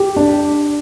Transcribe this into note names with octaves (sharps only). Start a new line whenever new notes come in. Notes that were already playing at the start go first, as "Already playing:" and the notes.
Already playing: G4
D4